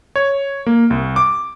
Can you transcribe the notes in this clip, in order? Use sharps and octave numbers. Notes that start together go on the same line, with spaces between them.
C#5
A#3
C2
D6